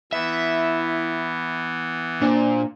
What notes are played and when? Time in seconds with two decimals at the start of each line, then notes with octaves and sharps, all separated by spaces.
0.13 E3 B3 E4 E5
2.22 A#2 D4 C5